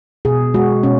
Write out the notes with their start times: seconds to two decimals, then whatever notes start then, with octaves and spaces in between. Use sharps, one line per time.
0.25 B2 G#4
0.54 G#3 F#4
0.83 B2 C#4